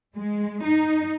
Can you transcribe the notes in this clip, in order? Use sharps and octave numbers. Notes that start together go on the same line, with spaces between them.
G#3
D#4